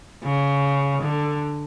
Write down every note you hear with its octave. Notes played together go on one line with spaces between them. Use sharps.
C#3
D3